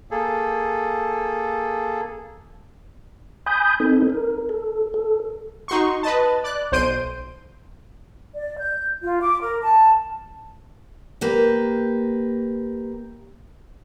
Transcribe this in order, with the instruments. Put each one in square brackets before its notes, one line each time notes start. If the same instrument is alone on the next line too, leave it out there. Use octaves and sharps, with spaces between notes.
[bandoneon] A#3 G#4 A4
[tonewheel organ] G#5 B5 D#6 G6
C4 D#4 A4
A#4
A4
A4
[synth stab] D#4 F#4 C6 C#6
B4 D#5 A5
D5 F#6
B1 C5 C6 G6 D7 D#7
[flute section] D5
G6
F4
D6
A#4
A5
[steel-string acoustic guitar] A#3 G4 B4